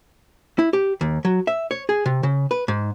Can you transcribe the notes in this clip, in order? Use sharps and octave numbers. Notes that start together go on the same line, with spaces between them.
E4
G4
D#2
F#3
E5
C#5
G#4
C3
C#3
B4
G#2